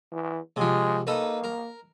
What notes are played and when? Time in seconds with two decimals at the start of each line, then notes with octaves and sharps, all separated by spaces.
0.12 E3
0.56 C3 F3 G#3
1.07 A#3 D#4 A4 B4
1.44 A#4